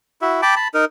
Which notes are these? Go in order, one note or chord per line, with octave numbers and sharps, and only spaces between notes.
E4 F#4 E5
G5 A5 B5 D6
A5 B5
D#4 A#4